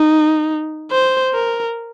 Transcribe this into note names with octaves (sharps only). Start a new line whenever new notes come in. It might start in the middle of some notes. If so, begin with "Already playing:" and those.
Already playing: D#4
C5
A#4